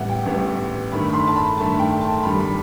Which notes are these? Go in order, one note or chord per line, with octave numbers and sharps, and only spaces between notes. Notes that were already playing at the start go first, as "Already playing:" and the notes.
Already playing: A1 A2 G3 B3 E5 F#5
G5
A1 A2 G3 B3
G2 D#3 A3 B5
B5
C6
A5
B5
G2 D#3 A3 A5
G5
A5
G2 D#3 G3 B5
B5